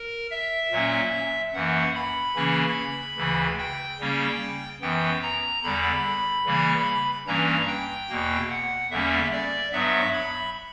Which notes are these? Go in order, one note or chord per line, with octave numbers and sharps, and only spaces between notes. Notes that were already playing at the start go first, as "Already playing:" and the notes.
Already playing: A#4
E5
A#2 F#3 A#3 C#4
F#2 E3 A#3 F#5
B5
C#3 E3 A#3 C#4
D2 C#3 E3
G5
C#3 G3 A#3 C#4
F#2 E3 B3 G5
A#5
E2 D3 G3 B5
C#3 E3 G3 A#3
G2 E3 G3 A#3 C#4 A#5
G5
E2 B2 A#3
F#5
E2 D3 G3 A#3 C#4 E5
D5
G2 F#3 B3 E5
B5